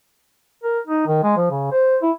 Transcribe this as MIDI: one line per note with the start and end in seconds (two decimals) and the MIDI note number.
0.64 0.80 70
0.87 1.04 63
1.07 1.21 51
1.23 1.37 56
1.37 1.51 53
1.51 1.70 49
1.72 1.97 72
2.02 2.11 64